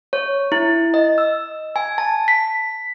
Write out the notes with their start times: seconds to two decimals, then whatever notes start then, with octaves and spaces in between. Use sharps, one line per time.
0.13 C#5
0.52 E4
0.94 D#5
1.18 E6
1.76 G#5
1.98 A5
2.28 B6